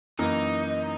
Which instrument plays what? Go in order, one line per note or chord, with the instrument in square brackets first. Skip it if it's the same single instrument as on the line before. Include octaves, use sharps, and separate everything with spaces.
[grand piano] F#2 E3 A#3 [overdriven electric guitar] D#4